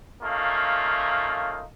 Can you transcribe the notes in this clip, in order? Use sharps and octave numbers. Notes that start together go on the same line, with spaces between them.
A3 A#3 C#4 D#4 F4